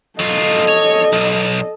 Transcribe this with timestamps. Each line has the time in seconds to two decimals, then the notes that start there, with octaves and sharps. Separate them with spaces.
0.19 F#3 F4 A4 D#5
0.68 C#5
1.13 B1